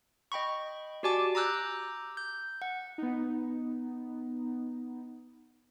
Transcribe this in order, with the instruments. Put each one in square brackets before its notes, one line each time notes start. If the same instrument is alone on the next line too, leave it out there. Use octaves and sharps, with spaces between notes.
[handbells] D#5 G5 B5 C#6
F#4 G4 D5 G#5 A5 D6
A#5 D6 E6 F#6 G6
G6
F#5
[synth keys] B3 D#4